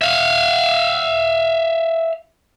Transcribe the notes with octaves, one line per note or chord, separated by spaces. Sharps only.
E5 F5